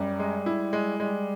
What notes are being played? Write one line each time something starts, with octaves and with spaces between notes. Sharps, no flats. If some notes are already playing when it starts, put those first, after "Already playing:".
Already playing: F#2 G3
G#3
E4
G#3
G3 G#3